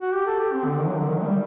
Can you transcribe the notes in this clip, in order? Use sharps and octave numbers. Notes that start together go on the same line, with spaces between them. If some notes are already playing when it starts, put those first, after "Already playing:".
F#4
G4
A4
G4
C4
D3
D#3
F#3
D3
D#3
F#3
A3
G3